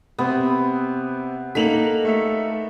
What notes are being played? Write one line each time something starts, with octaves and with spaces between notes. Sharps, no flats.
C3 B3 C4
A#3 D#4 A4 B6 F7 F#7
A3 E5 B6